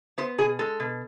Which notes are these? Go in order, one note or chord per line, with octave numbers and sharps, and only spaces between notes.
B3 C5
B2 G#4
G#3 A4
B2